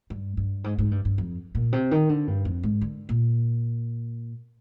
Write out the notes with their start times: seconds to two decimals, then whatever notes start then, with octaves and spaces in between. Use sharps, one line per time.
0.10 G2
0.37 G2
0.64 G#2
0.78 G#2
0.91 G2
1.05 G2
1.18 F2
1.55 A#2
1.72 C3
1.91 D#3
2.09 D3
2.27 G2
2.45 F2
2.63 G#2
2.81 D3
3.09 A#2